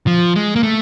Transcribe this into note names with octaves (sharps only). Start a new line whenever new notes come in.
F3
G#3
A#3
A3